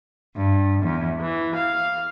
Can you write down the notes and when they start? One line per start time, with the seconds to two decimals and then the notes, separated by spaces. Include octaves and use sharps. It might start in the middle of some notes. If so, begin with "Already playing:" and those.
0.36 G2
0.81 E2
1.20 E3
1.55 F5